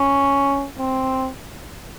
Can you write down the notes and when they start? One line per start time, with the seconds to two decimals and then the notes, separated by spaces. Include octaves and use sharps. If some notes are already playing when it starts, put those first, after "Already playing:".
Already playing: C#4
0.79 C4